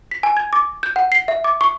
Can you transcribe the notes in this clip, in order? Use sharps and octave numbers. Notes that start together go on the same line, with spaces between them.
B6
G#5
G#6
D6
G6
F#5
C7
E5
D6
C#6